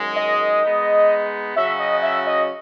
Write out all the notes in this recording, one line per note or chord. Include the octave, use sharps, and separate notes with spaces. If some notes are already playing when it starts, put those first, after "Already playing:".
Already playing: F#2 D#3 G#3
D#5
G#3 B3 D#4
C#3 F#3 C#4 F#4 E5
D#5
E5
D#5